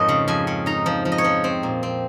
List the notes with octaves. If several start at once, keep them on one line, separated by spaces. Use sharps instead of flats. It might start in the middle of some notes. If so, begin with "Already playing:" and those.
Already playing: F2 G#2 A#3 C#5 D#5
C#3
F2 G#5
C#3
D#4 A#5
F3
F3
D#5
C#5
F3
C4
A#2
C4